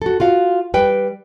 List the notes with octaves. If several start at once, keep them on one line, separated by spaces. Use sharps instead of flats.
F#4 A4
F4 F#4 F5
G3 B4 G5